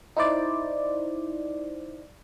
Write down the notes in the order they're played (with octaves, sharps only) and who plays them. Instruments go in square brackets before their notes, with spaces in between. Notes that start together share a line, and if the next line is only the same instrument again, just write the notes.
[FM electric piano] D#4 E4 C5 D5